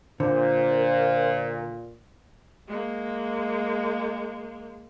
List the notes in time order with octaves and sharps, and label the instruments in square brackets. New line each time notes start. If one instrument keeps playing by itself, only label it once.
[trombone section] A#2 [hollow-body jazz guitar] D3 [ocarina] A#4 [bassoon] C5
[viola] G#3 A#3